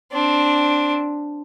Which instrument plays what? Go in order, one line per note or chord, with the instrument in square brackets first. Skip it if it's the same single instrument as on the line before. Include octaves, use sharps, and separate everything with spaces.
[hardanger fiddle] C4 D4